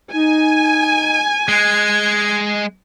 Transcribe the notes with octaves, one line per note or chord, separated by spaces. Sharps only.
D#4 G#5
G#3 F#6 G#6